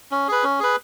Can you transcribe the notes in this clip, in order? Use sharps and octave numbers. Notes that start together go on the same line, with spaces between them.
C#4
G#4 B4
C#4
G#4 B4